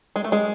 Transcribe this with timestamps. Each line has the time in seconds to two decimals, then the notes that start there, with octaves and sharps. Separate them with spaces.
0.16 G#3
0.24 A3
0.32 G#3